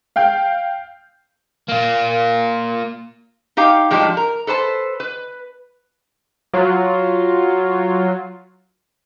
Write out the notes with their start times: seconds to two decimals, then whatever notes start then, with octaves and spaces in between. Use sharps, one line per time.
0.16 F5 G5 G6
1.69 A#3 F4
3.57 D#4 G4 F5 G5
3.91 A2 F3 G#3 D4 D#4 G4
4.17 A#4
4.47 A4 B4 C5 A5
5.00 B4
6.54 F#3 F4